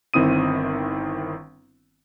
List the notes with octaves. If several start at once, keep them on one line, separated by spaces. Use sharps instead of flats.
G1 D#3 C4 E4 D#6 D#7